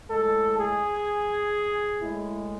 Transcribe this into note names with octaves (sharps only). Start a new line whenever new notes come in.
A2 G#3 A4
G#4
A2 G#3 E4